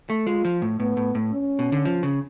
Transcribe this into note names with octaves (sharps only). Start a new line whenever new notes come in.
A3
G#3 F4
F3
A2
A2 B3
A2
A2
C#4
B2
D3
F3
C#3